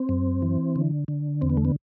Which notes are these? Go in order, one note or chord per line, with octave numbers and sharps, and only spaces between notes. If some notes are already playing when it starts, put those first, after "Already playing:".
Already playing: C4
F#2
E3
D3
D3
E2 C4
B3
A3
B3